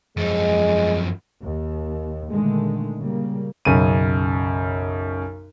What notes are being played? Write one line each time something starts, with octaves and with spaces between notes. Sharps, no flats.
F#2 F3 G#3
D#2
A#2 D3 D#3 G#3 A3
C#3 G3 A#3
B1 F#2 C#3 D#7